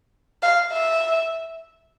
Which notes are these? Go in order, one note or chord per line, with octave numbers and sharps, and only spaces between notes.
F5
E5